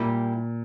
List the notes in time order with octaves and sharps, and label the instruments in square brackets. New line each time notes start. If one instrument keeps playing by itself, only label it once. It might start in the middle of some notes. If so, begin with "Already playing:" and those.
Already playing: [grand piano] A#2 [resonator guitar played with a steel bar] G3 A#3 E4 G4